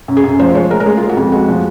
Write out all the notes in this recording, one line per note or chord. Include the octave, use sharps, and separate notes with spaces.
F#2
G#4
F#2
F3 C5
G#3 C#5
G#3 A#4
A#4
G#3 G#4
F4
G#3
F#4
F2
G#3 F#4
F3